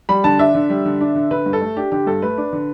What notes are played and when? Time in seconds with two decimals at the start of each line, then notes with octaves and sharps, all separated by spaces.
0.09 G3 B5
0.24 D3 A5
0.39 D4 E5
0.55 D3
0.70 G3
0.85 D3
1.01 D4
1.15 D3
1.31 D3 B4
1.46 G2
1.53 A4
1.61 A3
1.77 D4 G4
1.92 D3 G4
2.07 G2 A4
2.22 A3 B4
2.38 D4
2.53 D3